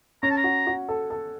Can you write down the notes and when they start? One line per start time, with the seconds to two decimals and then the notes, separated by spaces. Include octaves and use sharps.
0.23 C#4 A#5
0.30 A5
0.37 A#5
0.44 F#4
0.67 F#4
0.89 A4
1.10 A4